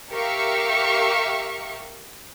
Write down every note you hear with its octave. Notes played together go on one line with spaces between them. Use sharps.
G4 A#4 E5 F5 C#6 C#7